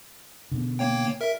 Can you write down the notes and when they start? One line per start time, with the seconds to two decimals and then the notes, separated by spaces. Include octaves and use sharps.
0.52 B2 D3
0.79 A#3 C#5 G5
1.21 A#4 E5